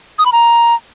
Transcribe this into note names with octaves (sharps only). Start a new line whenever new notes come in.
D#6
B5
A#5